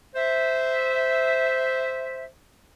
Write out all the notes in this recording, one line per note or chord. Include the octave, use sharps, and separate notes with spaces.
C5 E5